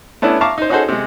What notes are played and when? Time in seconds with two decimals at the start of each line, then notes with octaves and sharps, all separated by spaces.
0.22 A3 B3 C#4 D4 E4
0.41 E5 F5 A5 A#5 C#6 D6
0.58 D#4 C5
0.69 C#4 D#4 F#4 G#4 A4 C5
0.89 C3 G#3